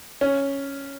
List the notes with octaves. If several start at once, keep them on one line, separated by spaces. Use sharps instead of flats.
C#4